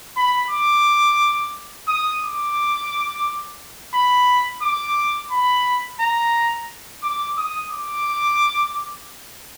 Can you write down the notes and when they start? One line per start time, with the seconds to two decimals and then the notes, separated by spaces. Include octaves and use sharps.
0.17 B5
0.50 D6
1.88 D#6
2.23 D6
3.94 B5
4.62 D6
5.31 B5
6.00 A#5
7.03 D6
7.38 D#6
7.71 D6